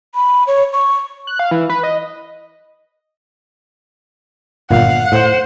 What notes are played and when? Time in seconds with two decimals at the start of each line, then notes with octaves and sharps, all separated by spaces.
0.15 B5
0.47 C#5
0.73 C#6
1.27 F#6
1.39 F5
1.51 E3
1.69 B4
1.83 D#5
4.71 G1 A#2 F5 F#5
5.12 A2 C5